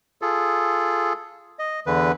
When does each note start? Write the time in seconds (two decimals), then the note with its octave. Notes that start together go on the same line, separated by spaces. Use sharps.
0.22 F4 G#4 A4
1.59 D#5
1.87 E2 D3 E3 B4